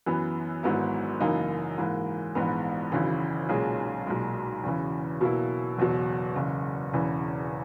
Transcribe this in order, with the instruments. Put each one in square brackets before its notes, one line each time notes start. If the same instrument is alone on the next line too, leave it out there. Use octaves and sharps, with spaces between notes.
[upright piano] F#2 E3 B3
G#1 G#2 F#3 B3 E4
F#1 F#2 E3 A#3 D#4
G#2 E3 A#3
A#1 G#2 E3 B3
G#1 F#2 C#3 E3
B1 A#2 G#3 C#4 G#4
B1 A#2 G#3
E2 C#3 E3
B2 F#3 A#3 E4
F#1 E2 B2 F#3
F#1 E2 C#3
E1 E2 C#3 E3